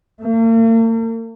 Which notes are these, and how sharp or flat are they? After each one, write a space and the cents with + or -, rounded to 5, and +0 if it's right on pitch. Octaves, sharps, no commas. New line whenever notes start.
A#3 -45